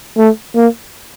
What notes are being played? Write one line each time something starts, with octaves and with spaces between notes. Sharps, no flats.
A3
A#3